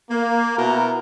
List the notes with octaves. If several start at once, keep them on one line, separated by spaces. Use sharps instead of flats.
A#3
B2 E4 F#4 A#4 A#5